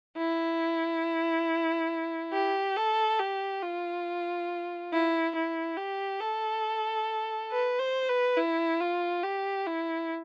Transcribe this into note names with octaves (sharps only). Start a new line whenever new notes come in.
E4
G4
A4
G4
F4
E4
E4
G4
A4
B4
C5
B4
E4
F4
G4
E4